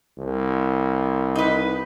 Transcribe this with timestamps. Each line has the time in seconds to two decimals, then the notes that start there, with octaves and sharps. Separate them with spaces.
0.18 C2
1.35 D#4 B4